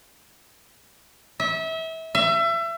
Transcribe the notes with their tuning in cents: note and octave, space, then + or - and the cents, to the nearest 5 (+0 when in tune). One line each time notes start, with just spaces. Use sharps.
E5 -30
E5 +30